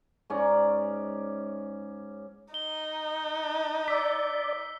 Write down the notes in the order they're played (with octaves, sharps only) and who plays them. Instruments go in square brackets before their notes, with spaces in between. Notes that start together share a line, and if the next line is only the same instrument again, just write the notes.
[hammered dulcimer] G#2 C#4 D5 A#5
[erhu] D#4 [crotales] G7
[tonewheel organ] D5 [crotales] E6 B6